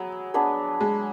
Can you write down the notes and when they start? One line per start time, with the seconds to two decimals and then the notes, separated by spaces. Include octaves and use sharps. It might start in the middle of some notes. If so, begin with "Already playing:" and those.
Already playing: F#3 B3 G#4
0.34 B3 D4 G#4 B4
0.81 G#3